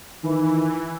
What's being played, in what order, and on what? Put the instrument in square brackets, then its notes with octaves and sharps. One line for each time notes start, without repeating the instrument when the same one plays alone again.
[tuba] D#3 [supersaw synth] E3